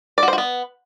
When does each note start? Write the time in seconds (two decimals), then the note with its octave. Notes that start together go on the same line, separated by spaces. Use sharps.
0.18 D5
0.23 F#4
0.28 C5
0.33 F#4
0.38 B3